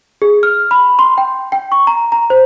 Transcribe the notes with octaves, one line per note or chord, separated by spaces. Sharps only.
G#4
F6
B5
C6
G5
G5
C#6
A#5
A#5
C5